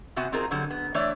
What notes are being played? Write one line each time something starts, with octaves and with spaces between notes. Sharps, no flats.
C3 B3 F#4 F#5 G#5
C4 D#4 F4 G#4 A#4
D3 F#3 G3
B3
E3 A3 D4 C#5 D5